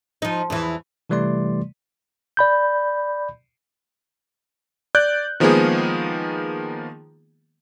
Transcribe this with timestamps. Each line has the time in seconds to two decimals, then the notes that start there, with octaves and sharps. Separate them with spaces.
0.22 F3 D#4
0.50 E2 E3
1.10 C3 E3 G3 A3 D5 C6
2.37 D5 B5 G6
4.95 D5 F#6 G6
5.40 D#3 F3 G#3 A#3 B3 G#4